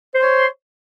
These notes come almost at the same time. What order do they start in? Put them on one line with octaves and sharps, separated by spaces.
C5 C6 C#5